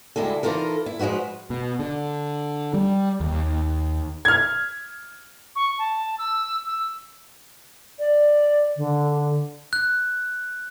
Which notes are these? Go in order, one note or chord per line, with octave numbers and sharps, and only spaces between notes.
D2 G3 G#3 E4 A4
E3 D#4 F4 A4 A#4
E4
F3 G#3 F4 F#4 B4
B2
D3
G3
D#2
F6 G#6
C#6
A5
E6
E6
D5
D3
F#6